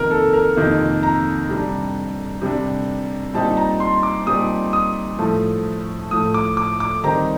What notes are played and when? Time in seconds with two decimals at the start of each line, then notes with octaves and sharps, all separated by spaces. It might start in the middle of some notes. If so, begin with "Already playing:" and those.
Already playing: F2 C3 D#3 A#3 A#4
0.11 A4
0.33 A#4
0.56 F2 C3 D#3 A#3
1.03 A#5
1.49 C3 G3 D4
2.42 C3 G3 D4
3.34 A#2 G3 C4 D#4 A5
3.57 A#5
3.80 C6
4.03 D6
4.26 A#2 G3 C4 D#4 D#6
4.73 D#6
5.19 A2 F3 A3
6.11 A2 F3 A3 D#6
6.34 D6
6.57 D6
6.80 D6
7.03 D#3 G3 C4 D#4 A#5